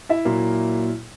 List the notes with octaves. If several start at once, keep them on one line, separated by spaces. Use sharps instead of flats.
E4 E5
A#2 F#3 A#3